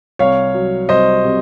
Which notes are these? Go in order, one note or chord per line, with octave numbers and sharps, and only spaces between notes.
C2 C#5 F5
F#3
C2 C5 D#5
C3